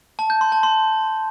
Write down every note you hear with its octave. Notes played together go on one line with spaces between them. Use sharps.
A5
G6
C6
A5
C6